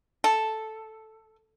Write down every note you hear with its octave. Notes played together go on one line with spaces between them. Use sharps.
A4